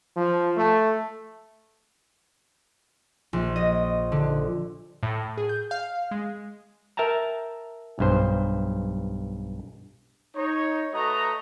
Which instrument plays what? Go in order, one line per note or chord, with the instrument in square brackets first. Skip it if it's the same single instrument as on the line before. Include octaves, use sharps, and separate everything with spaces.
[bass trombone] F3
A3
[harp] A#1
D#5
D3
[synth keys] A2
G#4
G6
F5
G#3
[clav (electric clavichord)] A#4 E5 G5 A5 A#5
B1 G2 C5
[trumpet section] D#4 C#5
A3 F#4 B4 D#5 A#5 C#6